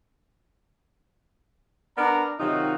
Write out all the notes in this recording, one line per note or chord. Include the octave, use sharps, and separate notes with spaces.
B3 D4 A#4 D5 A#5
C3 D#3 F#3 D#4 F4 F#4